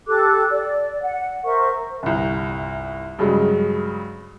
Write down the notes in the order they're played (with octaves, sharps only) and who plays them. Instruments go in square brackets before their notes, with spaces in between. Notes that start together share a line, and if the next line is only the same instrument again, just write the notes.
[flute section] G4 A4 D6 F#6
D5
F#5
A#4 C5 E5 C#6
[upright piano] G1 C2
G2 C#3 F#3 G#3